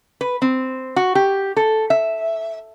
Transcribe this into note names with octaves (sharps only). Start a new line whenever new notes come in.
B4
C4
F#4
G4
A4
E5